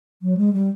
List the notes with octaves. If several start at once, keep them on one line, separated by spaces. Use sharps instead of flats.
F#3
G#3
G3